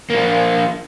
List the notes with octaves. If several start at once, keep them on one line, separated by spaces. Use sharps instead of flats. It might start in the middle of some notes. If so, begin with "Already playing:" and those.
F3 A#3